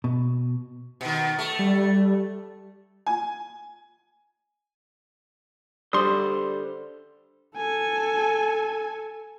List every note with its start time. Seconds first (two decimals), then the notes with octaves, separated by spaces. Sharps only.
0.04 B2
1.01 B2 D#3
1.39 A3
1.59 G3
3.06 G#5
5.93 D3 G3 C5 C6 D#6
7.57 A4 G#5